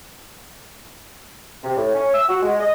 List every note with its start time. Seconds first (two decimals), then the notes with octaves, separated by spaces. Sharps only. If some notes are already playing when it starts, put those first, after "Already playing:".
1.64 C3
1.77 A2
1.94 C#4
2.14 E6
2.29 F#4
2.42 G#3
2.60 D#5